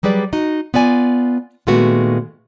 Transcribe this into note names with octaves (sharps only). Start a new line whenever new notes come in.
F#3 G3 G#4 B4 D5
D#4 F#4 D#5
B3 F4 D5 G#5
A#2 D#3 G#3 A3 B3 F#4